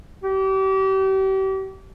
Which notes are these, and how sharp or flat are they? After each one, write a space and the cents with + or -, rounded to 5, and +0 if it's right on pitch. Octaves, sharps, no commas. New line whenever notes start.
G4 -35